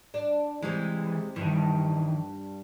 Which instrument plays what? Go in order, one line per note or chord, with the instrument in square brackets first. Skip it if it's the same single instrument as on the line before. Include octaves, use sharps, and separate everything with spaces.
[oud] D4
[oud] C3 G#3 [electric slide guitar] E3
[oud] G2 [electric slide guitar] D#3 E3